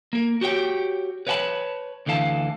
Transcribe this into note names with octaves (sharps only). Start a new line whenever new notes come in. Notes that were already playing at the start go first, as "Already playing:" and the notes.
A#3 A#4
F#4 G4 C#5 G5
B4 C#5 E5 G5 A5 B5
D2 D3 E3 F5 A5